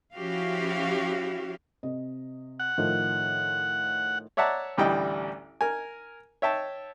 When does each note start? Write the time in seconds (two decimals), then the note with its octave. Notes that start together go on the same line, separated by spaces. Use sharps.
0.15 F3 C#4 E4 F#4 G4 F5
1.83 C3 D#5
2.60 F#5
2.78 A2 D#3 F3
4.37 C#5 D5 E5 F#5 A5 A#5
4.78 A1 D2 G3 E4 D#5 G5
5.61 A#4 G#5
6.42 C#5 E5 G5 A5